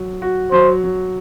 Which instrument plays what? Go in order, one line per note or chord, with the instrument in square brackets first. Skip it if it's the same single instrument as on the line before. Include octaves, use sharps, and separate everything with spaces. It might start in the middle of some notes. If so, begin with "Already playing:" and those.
Already playing: [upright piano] F#3
F#4
[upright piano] F#3 [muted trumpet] C5
[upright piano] F#3